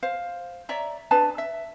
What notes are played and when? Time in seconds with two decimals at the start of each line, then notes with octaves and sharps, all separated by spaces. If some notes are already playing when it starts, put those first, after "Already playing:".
0.03 C5 F5
0.69 C#5 D5 E5 A#5
1.11 D4 G#4 B4 A5
1.38 E5